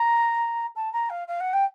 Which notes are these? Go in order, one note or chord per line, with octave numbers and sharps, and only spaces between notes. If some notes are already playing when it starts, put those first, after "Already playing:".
Already playing: A#5
A5
A#5
F5
F5
F#5
G5